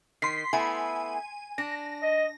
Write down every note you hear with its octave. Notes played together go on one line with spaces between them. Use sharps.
D#3 C6 B6 C7
A3 B3 E4 G#5
D4 A#6
D#5